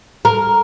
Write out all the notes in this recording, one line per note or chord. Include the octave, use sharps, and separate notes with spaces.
A#4